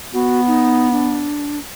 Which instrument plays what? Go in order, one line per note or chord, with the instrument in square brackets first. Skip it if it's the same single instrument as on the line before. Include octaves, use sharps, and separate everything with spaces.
[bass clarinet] B3 [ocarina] F#4
[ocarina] D#4
D4